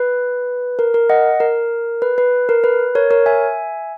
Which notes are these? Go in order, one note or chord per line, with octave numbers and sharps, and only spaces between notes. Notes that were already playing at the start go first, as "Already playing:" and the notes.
Already playing: B4
A#4
A#4
D#5 F#5
A#4
B4
B4
A#4
B4
A#4 C#5
A#4 C#5
E5 G#5